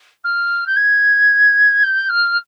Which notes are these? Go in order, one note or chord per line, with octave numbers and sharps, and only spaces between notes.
F6
G6
G#6
G6
F6